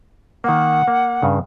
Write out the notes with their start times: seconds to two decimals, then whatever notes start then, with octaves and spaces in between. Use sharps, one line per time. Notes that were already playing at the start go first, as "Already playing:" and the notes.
0.44 D#3 A#3 F#5
0.88 A#3
1.22 G2 C#3